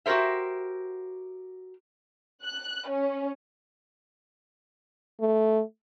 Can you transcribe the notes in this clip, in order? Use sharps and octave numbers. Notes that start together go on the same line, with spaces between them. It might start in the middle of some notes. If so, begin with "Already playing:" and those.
F#4 G4 A#4 C5 E5
F#6
C#4
A3